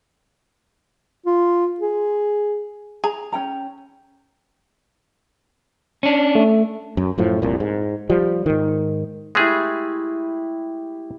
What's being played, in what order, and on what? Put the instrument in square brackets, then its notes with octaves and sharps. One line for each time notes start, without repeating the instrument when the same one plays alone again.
[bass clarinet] F4
G#4
[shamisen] G#4 [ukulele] A#5
[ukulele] C#4 G5 A#5
[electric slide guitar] C#4 D4
[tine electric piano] A3
[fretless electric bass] F#2
F#2 A2 F3
F1 C2 A#2
G#2
F3 G3
G#2 D#3
[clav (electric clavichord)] G#3 A3 G#4 [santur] E4 G4 B5